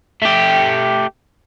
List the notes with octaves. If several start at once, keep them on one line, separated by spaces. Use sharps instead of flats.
A3 G4